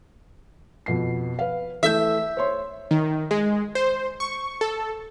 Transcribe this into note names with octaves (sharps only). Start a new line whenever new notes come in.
F2 B2 C7
B4 F5
E3 A3 E5 G6
C5 C#5 C6
D#3
G#3
C5
C#6
A4